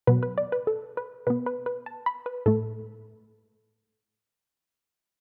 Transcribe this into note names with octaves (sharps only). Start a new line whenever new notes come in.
B2 F#3 B3 B4
B4
D5
B4
A4
B4
B2 B3 B4
B4
B4
A5
B5
B4
A2 A3 A4